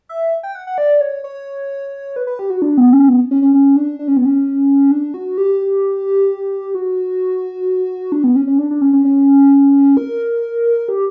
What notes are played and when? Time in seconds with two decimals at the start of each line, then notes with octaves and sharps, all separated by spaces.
0.09 E5
0.43 G5
0.55 F#5
0.67 F#5
0.78 D5
1.01 C#5
1.24 C#5
2.16 B4
2.27 B4
2.39 G4
2.50 F#4
2.62 D4
2.78 B3
2.93 C#4
3.08 B3
3.31 C#4
3.42 C#4
3.54 C#4
3.76 D4
3.99 D4
4.08 C#4
4.17 B3
4.25 C#4
4.91 D4
5.14 F#4
5.38 G4
6.75 F#4
8.12 D4
8.24 B3
8.35 C#4
8.47 C#4
8.58 D4
8.71 D4
8.81 C#4
8.93 C#4
9.05 C#4
9.97 A#4
10.88 G4